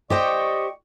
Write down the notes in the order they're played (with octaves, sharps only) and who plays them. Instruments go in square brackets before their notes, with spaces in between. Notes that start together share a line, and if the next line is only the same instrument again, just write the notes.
[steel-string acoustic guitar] G4 C5 G5 [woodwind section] D5 D#5 C#6